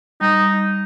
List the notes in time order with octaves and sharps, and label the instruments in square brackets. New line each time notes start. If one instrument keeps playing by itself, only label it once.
[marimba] G3 [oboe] D#4